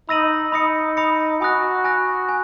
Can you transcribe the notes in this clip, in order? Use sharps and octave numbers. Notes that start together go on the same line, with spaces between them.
D#4 B5 E6 A#6 D#7 F#7
D#4 B5 D#6 A#6 C#7
B5 D#6 A#6 C#7
F#4 G#5 B5 D#6 F#6 A#6
G#5 B5 D#6 F#6 A#6
G#5